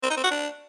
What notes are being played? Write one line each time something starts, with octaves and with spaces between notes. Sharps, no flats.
C4
D#4
C4
F#4
D4